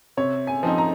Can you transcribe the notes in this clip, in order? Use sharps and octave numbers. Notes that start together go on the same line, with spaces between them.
C3 C#5
G#5
F3 C4 D#4
A#5